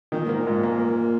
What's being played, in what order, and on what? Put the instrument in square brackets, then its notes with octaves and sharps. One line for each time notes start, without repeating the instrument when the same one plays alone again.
[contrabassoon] A#2 [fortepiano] D#3
[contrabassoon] G#2 [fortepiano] A#3
[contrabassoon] A#2
[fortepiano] G#2
A#3
A#3